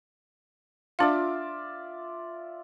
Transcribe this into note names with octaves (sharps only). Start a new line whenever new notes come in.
D4 F4 D5 E5 F5